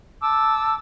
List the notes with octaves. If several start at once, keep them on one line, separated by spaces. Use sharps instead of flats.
A5 D6 E6